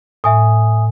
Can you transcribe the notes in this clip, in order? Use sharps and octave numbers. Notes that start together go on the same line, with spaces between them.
A2 E5 G#5 D#6